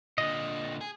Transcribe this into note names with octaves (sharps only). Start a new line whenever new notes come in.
A#2 D3 D#5
G#4